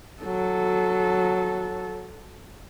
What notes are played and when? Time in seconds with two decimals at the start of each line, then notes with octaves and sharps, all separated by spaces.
0.22 F#3 A4